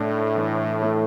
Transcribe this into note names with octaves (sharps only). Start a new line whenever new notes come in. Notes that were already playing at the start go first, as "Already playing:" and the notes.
Already playing: A2 A3 D4
E3
A3